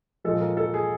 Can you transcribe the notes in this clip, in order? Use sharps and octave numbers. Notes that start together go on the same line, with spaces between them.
A#2 F3 G#3 A4
A#4
A4
G#4